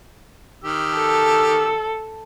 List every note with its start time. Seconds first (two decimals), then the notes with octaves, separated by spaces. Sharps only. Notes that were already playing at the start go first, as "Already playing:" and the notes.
0.64 D#3 G4 E6
0.97 A4